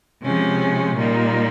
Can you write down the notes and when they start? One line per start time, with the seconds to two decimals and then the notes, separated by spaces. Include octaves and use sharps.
0.23 C3 F3 G#3 C#4
0.96 A#2 G3 A#3 D#4